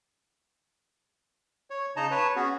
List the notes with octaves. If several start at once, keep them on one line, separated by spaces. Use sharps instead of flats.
C#5
C#3 D#4 D#5 A5 A#5
B4 C#5 A5
B3 C#4 F#4 G#4